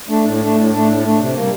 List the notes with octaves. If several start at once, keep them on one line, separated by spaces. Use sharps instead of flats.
A3 D4
A2
A3 D4
A2
A3 D4
A2
A3 D4
C3
G3 A#3